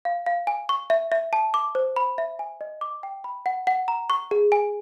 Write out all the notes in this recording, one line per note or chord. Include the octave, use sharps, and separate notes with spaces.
F5
F5
G#5
C#6
E5
E5
A5
D6
C5
B5
E5
G#5
D#5
D6
G5
B5
F#5
F#5
A#5
C#6
G#4
G#5